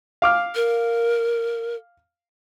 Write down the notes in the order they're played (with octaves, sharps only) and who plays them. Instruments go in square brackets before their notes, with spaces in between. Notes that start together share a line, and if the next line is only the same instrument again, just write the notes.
[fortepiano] F5 D6 F6
[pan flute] A#4